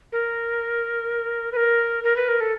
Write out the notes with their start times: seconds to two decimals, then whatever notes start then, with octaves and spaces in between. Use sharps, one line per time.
0.12 A#4
1.52 B4
1.57 A#4
2.04 A#4
2.16 B4
2.28 A#4
2.41 A4